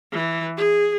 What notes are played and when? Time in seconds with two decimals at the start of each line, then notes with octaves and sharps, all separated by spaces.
0.13 E3
0.57 G#4